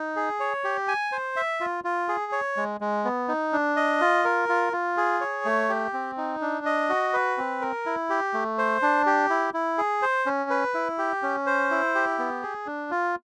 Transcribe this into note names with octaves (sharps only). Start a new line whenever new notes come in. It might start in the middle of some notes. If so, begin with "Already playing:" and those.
Already playing: D#4
G#4
C#5
G4
G#5
C5
E5
F4
F4
G#4
C#5
G#3
G#3
B3
D#4
D4
D#5
F4
A#4
F4
F4
G#4
C#5
A3
G4
C4
D#4
D4
D#5
F#4
B4
C4
A#4
E4
G4
A3
C5
D4
G4
E4
E4
G#4
C5
C#4
B4
E4
G4
C#4
C5
E4
G4
B3
G#4
D4
F4